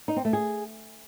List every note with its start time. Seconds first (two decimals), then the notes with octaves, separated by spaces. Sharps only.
0.08 D#4
0.16 C4
0.25 A3
0.33 G#4